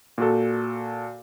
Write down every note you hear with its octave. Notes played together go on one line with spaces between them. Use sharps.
A#2 F#4 A4